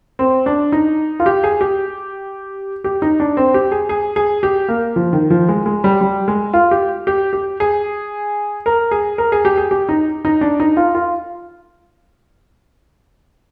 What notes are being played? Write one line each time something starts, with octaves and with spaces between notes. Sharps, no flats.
C4
D4
D#4
F4
G4
G#4
G4
G4
D#4
D4
C4
G4
G#4
G#4
G#4
G4
A#3
F3
D#3
F3
G#3
G#3
G3
G3
G#3
F4
G4
G4
G4
G#4
A#4
G#4
A#4
G#4
G4
G#4
G4
D#4
D#4
D4
D#4
F4
F4